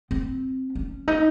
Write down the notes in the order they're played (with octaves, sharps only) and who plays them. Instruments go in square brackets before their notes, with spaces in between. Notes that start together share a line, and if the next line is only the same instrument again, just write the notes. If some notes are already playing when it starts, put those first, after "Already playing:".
[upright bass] C4
C#4
D#4